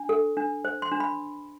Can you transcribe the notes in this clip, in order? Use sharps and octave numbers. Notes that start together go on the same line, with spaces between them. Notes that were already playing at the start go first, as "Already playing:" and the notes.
Already playing: D4
A4
D4
C5
C6
D4
B5